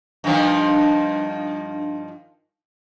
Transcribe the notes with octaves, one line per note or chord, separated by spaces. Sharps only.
G2 D#3 F3